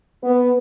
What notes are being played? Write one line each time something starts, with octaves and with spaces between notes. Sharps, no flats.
B3